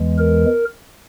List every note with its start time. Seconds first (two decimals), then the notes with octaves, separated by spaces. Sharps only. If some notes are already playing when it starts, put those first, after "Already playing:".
Already playing: E2 E3 G#3
0.19 A#4